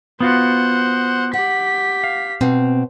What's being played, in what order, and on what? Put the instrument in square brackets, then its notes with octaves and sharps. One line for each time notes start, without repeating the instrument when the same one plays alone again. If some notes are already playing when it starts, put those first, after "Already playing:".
[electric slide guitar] B3 F4 F#4 [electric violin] C5 F#5
[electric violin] G4 B6 [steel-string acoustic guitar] F#5
[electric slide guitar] F5
[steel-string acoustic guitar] B2 C4